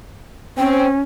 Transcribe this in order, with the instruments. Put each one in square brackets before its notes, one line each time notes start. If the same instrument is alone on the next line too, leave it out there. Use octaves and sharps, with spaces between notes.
[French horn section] C4 [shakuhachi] C#4